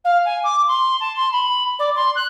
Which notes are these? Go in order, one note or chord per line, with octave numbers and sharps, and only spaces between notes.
F5
G#5
D6
C6
A5
C6
B5
D5
C6
F#6